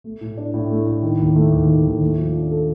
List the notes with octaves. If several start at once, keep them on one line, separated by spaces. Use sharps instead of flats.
A3
A2
D4
A2
A3
A2
D#3
D#2
A3
D#2
D#3
D#2
A3
F3
D4
A4